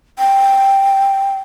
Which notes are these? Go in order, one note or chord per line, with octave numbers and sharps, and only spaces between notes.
G5